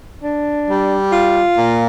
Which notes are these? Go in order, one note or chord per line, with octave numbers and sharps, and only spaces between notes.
D4
G3
F4
A#2